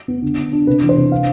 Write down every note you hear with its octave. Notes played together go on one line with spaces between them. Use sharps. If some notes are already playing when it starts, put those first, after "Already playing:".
B3
D3
D4
D4
C3 B4
E3
C5
C3
D4 F5